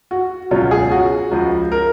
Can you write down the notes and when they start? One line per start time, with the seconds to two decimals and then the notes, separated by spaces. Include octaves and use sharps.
0.11 F#4
0.51 C#2 B2 F#3 C#4 F4
0.71 G#4
0.91 F#4
1.31 C#2 C#3 F3
1.72 A#4